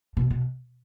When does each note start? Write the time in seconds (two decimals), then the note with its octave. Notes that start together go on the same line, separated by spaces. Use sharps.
0.17 B2
0.30 B2